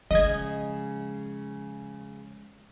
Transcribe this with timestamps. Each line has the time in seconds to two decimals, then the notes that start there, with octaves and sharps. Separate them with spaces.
0.11 C#3 F3 G#3 D#5 G#6